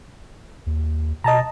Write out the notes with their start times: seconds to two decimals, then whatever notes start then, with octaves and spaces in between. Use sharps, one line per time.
0.67 D#2
1.24 B2 D#5 A5 A#5